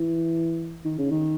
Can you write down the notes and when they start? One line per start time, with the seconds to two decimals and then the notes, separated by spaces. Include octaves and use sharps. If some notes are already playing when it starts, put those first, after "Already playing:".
Already playing: E3
0.85 D#3
0.98 C#3
1.11 D#3